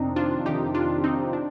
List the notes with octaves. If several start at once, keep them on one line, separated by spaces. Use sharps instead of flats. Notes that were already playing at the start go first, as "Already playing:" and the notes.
Already playing: F2 C3 D#3 C4 D4 D#4
D4 F4
F2 C3 D#3 D#4 G4
D4 F4
C4 D#4
D4